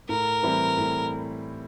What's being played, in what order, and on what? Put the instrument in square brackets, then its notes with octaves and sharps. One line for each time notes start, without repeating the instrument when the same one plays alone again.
[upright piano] A2 [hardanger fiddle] A#4
[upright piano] E3 G3 C4 E4
A2